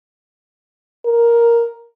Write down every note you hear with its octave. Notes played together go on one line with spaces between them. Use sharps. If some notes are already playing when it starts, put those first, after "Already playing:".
A#4